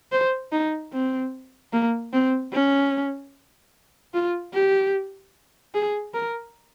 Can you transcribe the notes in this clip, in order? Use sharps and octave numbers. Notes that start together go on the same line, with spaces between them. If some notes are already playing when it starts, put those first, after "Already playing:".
C5
D#4
C4
A#3
C4
C#4
F4
G4
G#4
A#4